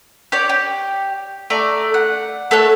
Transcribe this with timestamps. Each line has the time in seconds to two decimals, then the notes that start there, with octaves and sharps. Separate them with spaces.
0.32 G4 C#5 D5
0.49 G4
1.50 A3 D5 A#5
1.94 F#5
2.51 A3 A4 C#5 F#6